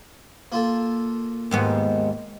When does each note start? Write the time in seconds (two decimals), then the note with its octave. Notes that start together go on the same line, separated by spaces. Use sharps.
0.52 A#3 F4 A4
1.51 D#2 G#2 B3